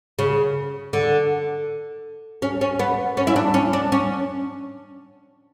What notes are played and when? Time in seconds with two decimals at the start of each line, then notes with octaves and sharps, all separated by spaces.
0.19 C#3
0.93 D3
2.42 C#4
2.61 C#4
2.79 B3
3.17 C#4
3.27 E4
3.36 D4
3.54 C#4
3.73 D4
3.92 C#4